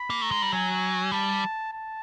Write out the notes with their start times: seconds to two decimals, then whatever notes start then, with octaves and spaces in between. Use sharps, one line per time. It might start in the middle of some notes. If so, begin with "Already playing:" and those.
Already playing: B5
0.10 A#3
0.22 A3 A#5
0.31 G#3
0.42 G3
0.52 F#3 G#5
1.12 G3 A5
1.72 A5